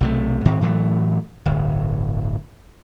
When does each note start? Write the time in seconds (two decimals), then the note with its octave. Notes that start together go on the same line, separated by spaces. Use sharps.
0.01 B1 C3 A3
0.45 G#2 D#3 C4
0.61 A2 E3 F#3 A3
1.46 D1 G1